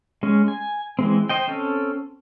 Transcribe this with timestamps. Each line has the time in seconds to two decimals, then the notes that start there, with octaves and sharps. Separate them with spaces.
0.23 G#3 C#4
0.48 G#5
0.99 E3 G#3 C4
1.29 C5 D#5 G5
1.48 C4 C#4 A4